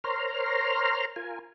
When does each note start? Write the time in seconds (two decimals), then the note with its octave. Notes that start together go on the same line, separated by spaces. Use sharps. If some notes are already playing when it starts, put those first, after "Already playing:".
0.04 A#4 C5 C#5 A#5 C6 F6
1.16 F4 A#4 G#5